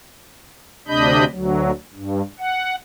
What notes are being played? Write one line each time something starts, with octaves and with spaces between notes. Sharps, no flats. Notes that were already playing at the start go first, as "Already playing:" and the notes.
D2 C3 D4 D#5 B5 G6
D2 F#3
G2
F#5